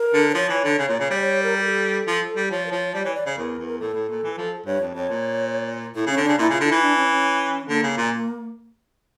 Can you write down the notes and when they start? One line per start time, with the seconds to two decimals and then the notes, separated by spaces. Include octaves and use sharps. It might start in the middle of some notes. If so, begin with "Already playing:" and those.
Already playing: A#4
0.13 D3
0.30 A#4
0.34 F3 C#5
0.49 E3
0.64 D3
0.78 C#3
0.88 A#2
1.00 C#3
1.10 G3 D5
1.21 C#5
1.43 A#4
1.57 G4
1.65 A4
2.07 F3
2.36 G3
2.51 F3 C#5
2.66 A#4
2.71 F3 C#5
2.93 G3 D5
3.04 E3 C#5
3.14 D5
3.26 C#3 C#5
3.37 E2 A#4
3.58 E2
3.68 A#4
3.79 A2 A4
3.94 A2
4.09 A#2
4.23 E3
4.37 F3
4.66 G2 C#5
4.80 F2
4.94 F2 C#5
5.09 A#2
5.95 A2 E4
6.06 C#3 C#4
6.17 D3
6.24 C#3 D4
6.38 A#2 E4
6.50 C#3 F4
6.60 D3
6.67 E3 E4
6.82 D4
6.97 C#4
7.11 C#4
7.68 D3 A#3
7.83 C#3
7.97 A#2